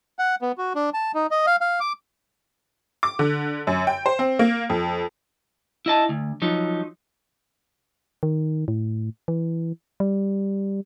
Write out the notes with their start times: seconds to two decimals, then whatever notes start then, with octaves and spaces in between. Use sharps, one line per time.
0.19 F#5
0.42 B3
0.58 F#4
0.75 D4
0.94 A5
1.14 D#4
1.31 D#5
1.47 F5
1.61 F5
1.80 D6
3.03 D6
3.19 D3
3.67 F#2
3.87 G5
4.06 C5
4.19 C4
4.39 A#3
4.70 F2
5.86 E4 D#5 A5
6.09 D2
6.42 F3 F#3 D#4
8.23 D#3
8.68 A2
9.28 E3
10.00 G3